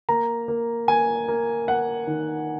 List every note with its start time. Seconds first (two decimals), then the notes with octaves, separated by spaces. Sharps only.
0.09 A#3 A#5
0.48 A#3
0.88 A#3 G#5
1.28 A#3
1.68 A#3 F#5
2.07 D#3